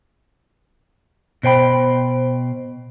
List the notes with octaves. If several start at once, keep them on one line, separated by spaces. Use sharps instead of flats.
B2 C5 G5 B5